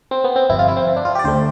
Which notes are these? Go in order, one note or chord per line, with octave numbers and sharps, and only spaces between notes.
C4
B3
C4
G1 F2 C3 E4
F4
E4
C4
C4
D4
F4
G4
D5
D2 D3 A3 C5